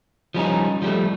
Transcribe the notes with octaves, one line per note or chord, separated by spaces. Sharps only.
F3 G3 C#4 D#4
F3 G3 A3